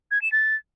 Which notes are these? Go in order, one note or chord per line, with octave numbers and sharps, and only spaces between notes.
G#6
E7
A6